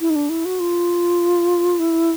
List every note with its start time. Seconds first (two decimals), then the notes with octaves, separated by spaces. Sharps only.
0.01 E4
0.10 D#4
0.15 D4
0.30 E4
0.45 F#4
0.60 F4
1.79 E4